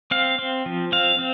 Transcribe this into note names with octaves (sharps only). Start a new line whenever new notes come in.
C4 F5
C4
F3
C4 F5
C4